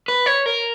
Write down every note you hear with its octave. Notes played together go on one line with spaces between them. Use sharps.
B4
C#5
A#4